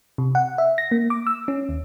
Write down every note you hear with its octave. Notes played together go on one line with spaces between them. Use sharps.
C3
F#5
E5
A#6
A#3
D6
E6
C#4
D#2